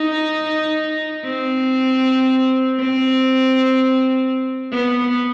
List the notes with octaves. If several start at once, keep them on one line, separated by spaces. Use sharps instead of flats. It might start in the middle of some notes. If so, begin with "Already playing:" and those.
Already playing: D#4
C4
C4
B3